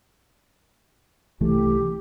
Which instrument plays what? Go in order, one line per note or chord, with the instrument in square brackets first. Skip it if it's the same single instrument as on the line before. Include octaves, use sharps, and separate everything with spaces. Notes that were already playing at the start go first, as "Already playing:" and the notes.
[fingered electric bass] C2 E3 A3 [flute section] G4